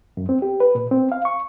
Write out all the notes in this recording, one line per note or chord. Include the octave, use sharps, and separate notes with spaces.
F#2
C4
G4
B4
A#2
C4
F5
C#6